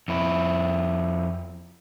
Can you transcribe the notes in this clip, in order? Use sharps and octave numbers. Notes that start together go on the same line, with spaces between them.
F2 E4